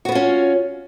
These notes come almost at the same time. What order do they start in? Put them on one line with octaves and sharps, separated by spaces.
F#4 B3 F4 C#4